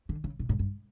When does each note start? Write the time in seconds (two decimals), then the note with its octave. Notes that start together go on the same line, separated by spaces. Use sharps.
0.09 D3
0.24 C#3
0.39 B2
0.49 A2
0.59 G2